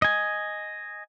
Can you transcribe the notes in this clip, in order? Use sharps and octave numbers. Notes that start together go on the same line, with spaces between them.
D#5 G#5